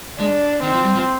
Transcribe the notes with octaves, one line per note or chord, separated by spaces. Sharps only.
G#3 D4
D#3 C4
F3
G3
F3